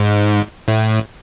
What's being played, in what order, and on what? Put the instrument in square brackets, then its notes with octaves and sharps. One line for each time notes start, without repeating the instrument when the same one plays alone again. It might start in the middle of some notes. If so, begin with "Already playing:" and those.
Already playing: [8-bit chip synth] G#2
A2